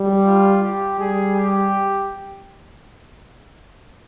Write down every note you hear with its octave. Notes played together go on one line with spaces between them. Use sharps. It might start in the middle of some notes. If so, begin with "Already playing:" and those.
Already playing: G3
F4
G4
G3 G#4
G4